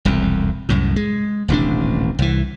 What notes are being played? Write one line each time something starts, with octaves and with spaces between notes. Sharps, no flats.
E1 C2 F2
C2 F#2 A2
G#3
D#1 A1 C3 D4
C2 E3